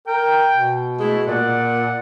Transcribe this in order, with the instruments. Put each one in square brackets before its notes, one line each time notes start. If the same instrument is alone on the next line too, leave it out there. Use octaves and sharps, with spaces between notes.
[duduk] A#4 [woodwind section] G5
[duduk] B2
[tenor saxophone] G#3 [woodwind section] A3 E4
[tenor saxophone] A#2 [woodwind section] D5 F#5